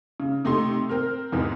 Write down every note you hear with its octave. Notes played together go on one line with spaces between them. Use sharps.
C#3
C3 A3 D#4 G4 C6
C4 A#4 F6
E2 G#2 C3 E3 G#3